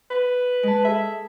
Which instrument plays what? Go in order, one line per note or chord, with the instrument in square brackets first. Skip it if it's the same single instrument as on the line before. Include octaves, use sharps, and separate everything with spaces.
[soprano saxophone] B4
[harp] G#3 A5
[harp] G#4 A4 [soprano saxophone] E5